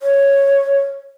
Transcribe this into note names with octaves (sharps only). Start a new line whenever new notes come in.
C#5